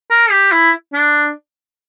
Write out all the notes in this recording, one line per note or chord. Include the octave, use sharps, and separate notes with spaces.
A#4
G4
E4
D4